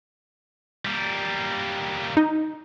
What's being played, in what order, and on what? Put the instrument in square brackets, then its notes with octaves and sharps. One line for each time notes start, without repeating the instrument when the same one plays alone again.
[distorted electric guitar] G3 A#3
[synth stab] D#4